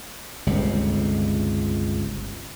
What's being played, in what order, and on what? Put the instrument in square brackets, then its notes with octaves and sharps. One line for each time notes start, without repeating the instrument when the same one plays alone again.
[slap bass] G1 C#2 C3